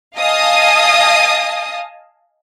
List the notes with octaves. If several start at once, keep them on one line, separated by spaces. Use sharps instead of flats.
D#5 F5 G#5 A5 D#6